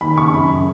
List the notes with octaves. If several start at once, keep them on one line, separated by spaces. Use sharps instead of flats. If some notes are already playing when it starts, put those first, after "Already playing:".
D#2 B5
C#3 C#6
F#2 B5
C#3